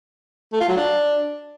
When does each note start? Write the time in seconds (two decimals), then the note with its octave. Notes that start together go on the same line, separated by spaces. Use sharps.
0.52 A3
0.60 F4
0.69 F#3
0.77 D4